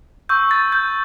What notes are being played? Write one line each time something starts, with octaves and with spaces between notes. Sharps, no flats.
C#6 E6 G6
A6
G6